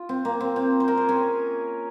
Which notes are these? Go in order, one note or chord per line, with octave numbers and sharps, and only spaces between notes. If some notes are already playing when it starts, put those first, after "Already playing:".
Already playing: F4
C4
A#3
C4
C4
C5
A#4
G#4
C#4